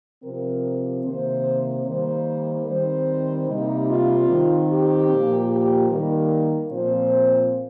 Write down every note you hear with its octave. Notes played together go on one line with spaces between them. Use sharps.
C3 F3 C4 A#4
C3 D#3 A#3 C5
D#3 G3 A#3 C5
D#3 G3 C4 C5
C3 G3 A#3 D#4
F4
D#3 C4
G4
A#2 F3 A#3
G4
D#3 G3 A#3 A#4
A#2 F3 C4 C5